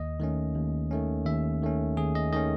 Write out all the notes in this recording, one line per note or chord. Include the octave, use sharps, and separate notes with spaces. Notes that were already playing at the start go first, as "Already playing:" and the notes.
Already playing: D#2 D#5
D#3 A3 C#4
D#2
D#3 A3 C#4
D#2 E5
D#3 A3 C#4
D#2 G#4
D#5
D#3 A3 C#4 D#5